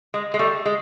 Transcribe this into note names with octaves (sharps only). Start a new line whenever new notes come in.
G#3
G#3
G3 A3
G#3